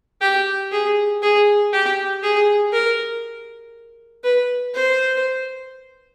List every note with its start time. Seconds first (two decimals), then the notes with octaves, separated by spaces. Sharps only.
0.21 G4
0.72 G#4
1.22 G#4
1.73 G4
2.23 G#4
2.73 A#4
4.24 B4
4.74 C5